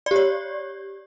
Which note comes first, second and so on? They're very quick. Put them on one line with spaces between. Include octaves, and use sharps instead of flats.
D5 G4 C#5